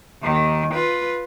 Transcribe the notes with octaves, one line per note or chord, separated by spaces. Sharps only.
D#2 D#3
F4 B4